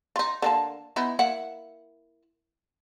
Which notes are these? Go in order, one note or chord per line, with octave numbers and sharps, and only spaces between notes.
D#4 F4
D3 A#3 A5
B3 D#4 E4
A#3 E4 F#5